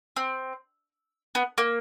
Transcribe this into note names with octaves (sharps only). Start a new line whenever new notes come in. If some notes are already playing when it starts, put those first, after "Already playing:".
C4
B3
A#3